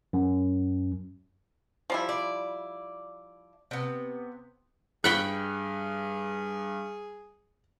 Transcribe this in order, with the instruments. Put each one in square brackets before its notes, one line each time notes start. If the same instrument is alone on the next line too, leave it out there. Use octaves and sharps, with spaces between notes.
[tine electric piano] F#2
[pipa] F3 G3 E4
[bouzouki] D5
C3 B3
[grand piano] G2 [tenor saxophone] G#4 [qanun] G5 B5 C#6 [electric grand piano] F#6